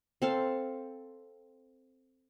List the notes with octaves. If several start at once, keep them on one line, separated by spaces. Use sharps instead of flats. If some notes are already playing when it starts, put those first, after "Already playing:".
C4 A4 F5